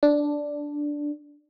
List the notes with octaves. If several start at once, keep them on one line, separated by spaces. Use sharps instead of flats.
D4